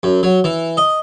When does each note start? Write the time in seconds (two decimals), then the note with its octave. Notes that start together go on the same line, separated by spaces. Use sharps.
0.03 F#2
0.23 F#3
0.44 E3
0.77 D#5